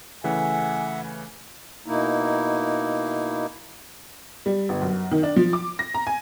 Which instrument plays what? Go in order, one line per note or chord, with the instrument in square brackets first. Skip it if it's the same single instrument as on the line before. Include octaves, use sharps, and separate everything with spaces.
[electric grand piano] C#3 E3 A3 [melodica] E5 F#5 [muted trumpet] G#5
[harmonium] B2 A#3 D#4 E4
[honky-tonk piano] G3
G1
F#2
D#3
D4
F3
D6
A#6
A#5
G#5